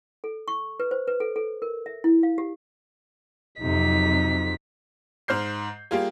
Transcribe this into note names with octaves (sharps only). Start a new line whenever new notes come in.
A4
C#6
B4
C5
B4
A4
A4
A#4
E5
E4
F5
G4
F2 C3 F#3 D#4 B6
G#2 C5 F6 G6 C7
G3 A#3 F4 G4 G#4